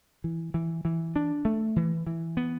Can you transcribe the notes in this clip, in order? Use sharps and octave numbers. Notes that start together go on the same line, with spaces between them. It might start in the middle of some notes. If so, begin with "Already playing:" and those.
E3
E3
E3
D4
A3
E3
E3
B3